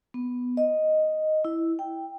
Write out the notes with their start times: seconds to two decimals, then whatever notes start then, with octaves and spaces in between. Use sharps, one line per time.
0.14 B3
0.57 D#5
1.45 E4
1.79 G5